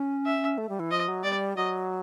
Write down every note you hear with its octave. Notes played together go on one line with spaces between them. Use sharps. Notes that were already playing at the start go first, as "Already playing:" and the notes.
Already playing: C#4
E5
A3
G3
E3
F3 D#5
F#3
G3 D5
F#3 D#5